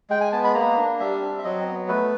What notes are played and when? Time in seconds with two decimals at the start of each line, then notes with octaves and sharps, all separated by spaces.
0.10 G#3 G5
0.21 G#5
0.32 B3 A5
0.44 B5
0.55 A#3 A#5
0.77 D4
1.00 G3 E5
1.21 C4
1.39 E5
1.44 F#3 D#5
1.67 B3
1.88 A3 B4